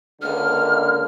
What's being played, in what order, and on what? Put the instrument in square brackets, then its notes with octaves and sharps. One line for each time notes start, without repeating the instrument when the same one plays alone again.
[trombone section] C#2 D3 A#3 [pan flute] F6